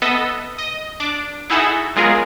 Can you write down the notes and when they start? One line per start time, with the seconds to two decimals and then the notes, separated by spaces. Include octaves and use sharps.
0.02 B3 A4 D#5 E5
0.58 D#5
1.00 D4 D6
1.50 D#4 E4 F#4 G#4 A4 E5
1.96 F#3 G#3 B3 F4 G#4 A#4